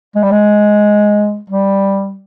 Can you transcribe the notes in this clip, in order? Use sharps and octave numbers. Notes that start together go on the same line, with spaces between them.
G#3
G3
G#3
G3